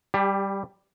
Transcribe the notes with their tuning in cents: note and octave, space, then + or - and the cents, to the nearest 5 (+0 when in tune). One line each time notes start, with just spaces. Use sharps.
G3 +0 G4 +30 A5 +15